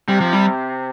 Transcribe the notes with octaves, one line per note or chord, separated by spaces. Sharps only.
C3 G3
F3
G3